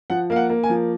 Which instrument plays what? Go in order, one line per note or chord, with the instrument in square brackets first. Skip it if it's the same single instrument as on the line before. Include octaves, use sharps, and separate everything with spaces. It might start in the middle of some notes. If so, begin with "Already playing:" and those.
[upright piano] F3 F#5
A#3 F5
F#5
A#3
G#5
F3